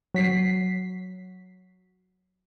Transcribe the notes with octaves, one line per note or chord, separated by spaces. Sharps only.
F#3 B6 C7